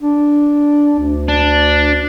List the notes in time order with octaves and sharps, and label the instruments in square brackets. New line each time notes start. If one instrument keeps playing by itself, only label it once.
[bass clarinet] D4
D2
[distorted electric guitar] D4